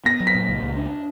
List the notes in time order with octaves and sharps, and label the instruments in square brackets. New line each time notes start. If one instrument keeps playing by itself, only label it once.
[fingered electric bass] B3 [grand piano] A#6
[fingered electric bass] F#3
[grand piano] B6
[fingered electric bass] A#2
C#2
C#2
D4